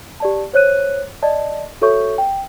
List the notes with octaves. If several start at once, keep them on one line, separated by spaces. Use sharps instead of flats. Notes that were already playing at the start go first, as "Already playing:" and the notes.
G4 D5 A5
C5 C#5 F#6 D#7
D5 D#5 A5
F#4 A4 C#5 E5 C#6 G6
G5